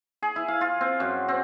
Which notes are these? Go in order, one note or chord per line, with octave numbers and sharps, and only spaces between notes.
G#4
E4
F5
F4
C4
F#2
C4